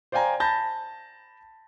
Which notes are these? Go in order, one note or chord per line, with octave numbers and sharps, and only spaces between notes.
C5 D5 F5 G5 G#5 A#5
A5 B5 G6 A6 A#6